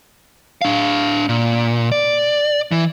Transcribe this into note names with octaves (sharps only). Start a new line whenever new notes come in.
D4 F5
A#2
D5
E3